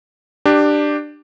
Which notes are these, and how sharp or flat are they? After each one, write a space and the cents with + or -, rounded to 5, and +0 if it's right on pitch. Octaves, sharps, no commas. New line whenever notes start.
D4 +15 G4 +0